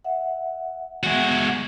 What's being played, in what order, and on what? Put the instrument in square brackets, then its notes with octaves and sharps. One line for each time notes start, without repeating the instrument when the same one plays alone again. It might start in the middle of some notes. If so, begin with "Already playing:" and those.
[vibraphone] E5 F#5
[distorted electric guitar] G#3 F#4 [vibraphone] B3 E5 F#5